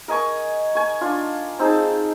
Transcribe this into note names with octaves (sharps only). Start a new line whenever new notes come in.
A#4 D#5 G#5 C#6
G#5 C#6
D4 F4
C4 D#4 G#4 A5